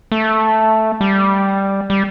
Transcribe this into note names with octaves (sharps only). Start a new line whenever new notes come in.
A3
G3
G3